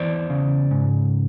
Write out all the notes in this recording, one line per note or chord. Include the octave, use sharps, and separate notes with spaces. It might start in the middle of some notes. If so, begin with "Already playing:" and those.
Already playing: E2 E3 C5 D5
C#3
G#2